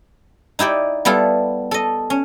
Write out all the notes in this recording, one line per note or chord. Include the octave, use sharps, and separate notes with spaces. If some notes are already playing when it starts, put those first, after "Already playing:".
D#4 E4 G4 D5
G3 B3 E4 F4 A4
A4 D#5
C#4